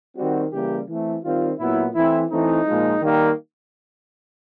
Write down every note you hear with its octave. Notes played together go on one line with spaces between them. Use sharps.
D#3 G3 C4 F#4
C#3 E3 G3 A#3 G4
E3 A3 C4
D#3 G3 C4 F4
A#2 F#3 B3 E4
E3 A3 C4 E4
E3 A3 C4 D#4
A#2 F3 G#3
D#3 G3 A#3